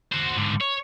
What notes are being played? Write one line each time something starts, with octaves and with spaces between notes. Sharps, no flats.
F#4 C5
G#2 D3
C#5